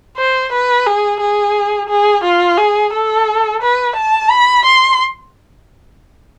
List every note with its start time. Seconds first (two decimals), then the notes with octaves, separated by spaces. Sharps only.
0.18 C5
0.52 B4
0.87 G#4
1.21 G#4
1.89 G#4
2.24 F4
2.58 G#4
2.93 A4
3.62 B4
3.96 A5
4.30 B5
4.66 C6